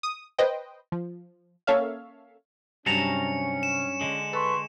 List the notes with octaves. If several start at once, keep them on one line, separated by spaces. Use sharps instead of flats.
D#6
B4 C5 D#5 G5
F3
A#3 C#4 A4 C#5 E5 F5
G2 C3 F#3 G3 C#4 A5 A#5 C#7
E7
D3 G#3
A4 B4 C6 C#6